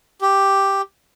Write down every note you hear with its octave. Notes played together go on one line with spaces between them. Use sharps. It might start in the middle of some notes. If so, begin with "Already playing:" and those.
G4